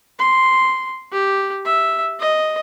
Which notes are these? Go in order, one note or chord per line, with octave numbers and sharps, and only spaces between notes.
C6
G4
E5
D#5